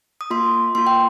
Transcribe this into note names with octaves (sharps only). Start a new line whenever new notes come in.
D#6
A#3 F4 C6
A#3 F4 C6
G5